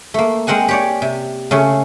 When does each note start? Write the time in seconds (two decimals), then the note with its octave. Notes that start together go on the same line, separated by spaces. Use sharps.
0.14 A3 A#3
0.47 G#3 C4 A#4 F#5 G#5
0.69 G4 C#5 D5
1.02 C3
1.51 C#3 A3 C#4